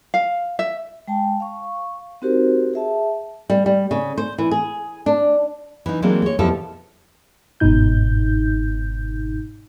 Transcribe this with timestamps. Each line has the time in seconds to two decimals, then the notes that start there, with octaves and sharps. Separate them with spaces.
0.14 F5
0.59 E5
1.08 G#3 G5 A5
1.40 F5 C#6
2.22 C4 D#4 F#4 G4 A#4 C5
2.74 G#4 E5 A5
3.50 G3
3.66 G3
3.91 C#3
4.18 C5
4.38 E3
4.51 G#4
5.06 D4
5.86 E3 D#4
6.02 E3 F#3 G#3 A#3 C4 D4
6.22 G#3 C#5
6.39 E2 B2 F3 E4 G4 A4
7.60 G1 G#2 B2 D#4 G6